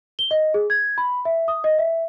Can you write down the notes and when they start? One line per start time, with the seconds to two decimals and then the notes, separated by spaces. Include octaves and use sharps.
0.19 G7
0.31 D#5
0.54 G#4
0.70 G#6
0.98 B5
1.25 E5
1.48 D#6
1.64 D#5
1.78 E5